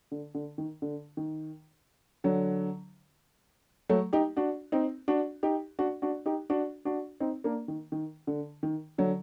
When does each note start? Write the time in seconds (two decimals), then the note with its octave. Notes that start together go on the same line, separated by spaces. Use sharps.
0.11 D3
0.34 D3
0.58 D#3
0.82 D3
1.17 D#3
2.24 D3 F#3
3.89 F#3 A3
4.13 D#4 G4
4.37 D4 F#4
4.72 C4 D#4
5.08 D4 F#4
5.43 D#4 G4
5.79 D4 F#4
6.02 D4 F#4
6.26 D#4 G4
6.50 D4 F#4
6.85 D4 F#4
7.20 C4 D#4
7.44 A#3 D4
7.68 D#3
7.92 D#3
8.27 D3
8.63 D#3
8.98 D3 F#3